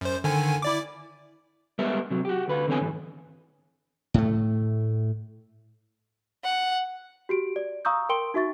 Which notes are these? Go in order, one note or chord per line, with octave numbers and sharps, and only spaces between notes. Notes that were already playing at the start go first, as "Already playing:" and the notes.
F#2 C5
D3 D#3 G#5
E4 D5 D6
G3 G#3 B3 A#4 B4 E5
C3 F#3
F#4 G4
D2 B4 F5
D3 E3 B3 C4 C#5 G#5
B1 G#2 E3
A2 A3
F#5
F#4 G4 D7
D5
F5 A#5 C#6 D#6 E6 G6
A#4 G5 C6 D7 G7
D#4 F#4 E5 C#6 A6